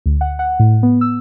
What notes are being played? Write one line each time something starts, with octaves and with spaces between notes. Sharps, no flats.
D2
F#5
F#5
A2
B3
E6